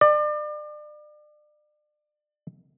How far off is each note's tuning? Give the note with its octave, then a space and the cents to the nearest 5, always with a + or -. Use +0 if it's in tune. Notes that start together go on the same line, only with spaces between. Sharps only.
D5 +35